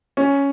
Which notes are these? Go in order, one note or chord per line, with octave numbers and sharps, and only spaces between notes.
C#4